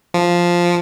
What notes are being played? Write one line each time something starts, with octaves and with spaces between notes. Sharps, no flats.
F3